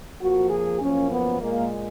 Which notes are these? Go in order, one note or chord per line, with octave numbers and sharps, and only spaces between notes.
F2 F3 A#3 F#4
G#4
F#2 F3 A#3 C#4
B3
A#2 G#3 A#3